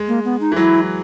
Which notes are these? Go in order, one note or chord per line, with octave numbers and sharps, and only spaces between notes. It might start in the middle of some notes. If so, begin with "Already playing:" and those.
Already playing: G#3
A#3
B3
D#4
E3
F#3 E4